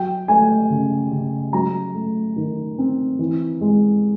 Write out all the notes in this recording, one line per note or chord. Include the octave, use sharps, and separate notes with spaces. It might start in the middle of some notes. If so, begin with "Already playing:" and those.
Already playing: F#3 G5
A3 G#5
C#3
C#3
F#3 A#5
A3
D#3
C4
E3
G#3